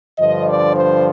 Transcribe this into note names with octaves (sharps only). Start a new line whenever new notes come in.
G2 D3 F3 D#5
D5
C5